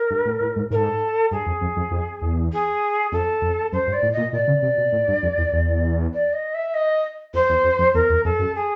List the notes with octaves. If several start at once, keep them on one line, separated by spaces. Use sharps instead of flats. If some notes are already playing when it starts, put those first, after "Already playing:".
Already playing: A#4
G2
A2
A2
G#2
G#2 A4 A#4
G2 G#4
F2
F2
F2
F2
E2
G#4
F2 A4
F2
F#2 C5
G2
D5
A2
A#2 D#5
A#2 D5
C#3
C3
B2
A2
G2
F2
E2
E2
D5
D#5
E5
D#5
F2 C5
E2
F2
F2
E2 A#4
E2
F2 A4
F#2
G#4